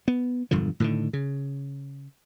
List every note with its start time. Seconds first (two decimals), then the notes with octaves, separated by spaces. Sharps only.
0.08 B3
0.51 E1 G2 D3 F3
0.80 A2 D3 D#3
1.13 C#3